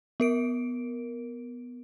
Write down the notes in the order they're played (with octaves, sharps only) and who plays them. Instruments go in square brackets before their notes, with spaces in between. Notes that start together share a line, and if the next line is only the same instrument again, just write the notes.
[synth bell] B3 A#4 D7